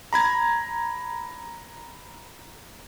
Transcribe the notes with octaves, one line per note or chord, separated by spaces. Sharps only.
A#5 B5 G#6